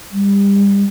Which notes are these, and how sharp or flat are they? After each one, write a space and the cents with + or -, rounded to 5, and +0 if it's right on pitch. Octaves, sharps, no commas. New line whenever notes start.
G3 +30